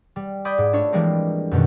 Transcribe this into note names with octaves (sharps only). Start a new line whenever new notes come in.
G3
D5 B5 D#6 G6 G#6
G#2
A3 D4 F4 C#5 E5
E3 F3 G3 G#3 A#3 C4
F#2 B2 D#3